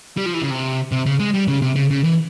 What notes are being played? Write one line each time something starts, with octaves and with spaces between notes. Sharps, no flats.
G3
F3
E3
C#3
C3
C3
C#3
G#3
G3
C#3
C3
C#3
C#3
E3